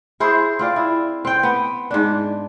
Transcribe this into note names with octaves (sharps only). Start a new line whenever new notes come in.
E4 G#4 C5
C4 F4 D5
E4
C4 G5
B3
G#2 D4